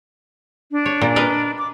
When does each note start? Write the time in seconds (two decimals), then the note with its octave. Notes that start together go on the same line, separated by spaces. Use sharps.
0.72 D4
0.86 C#5
1.01 A#2
1.16 A#4 B4 D#5
1.58 D6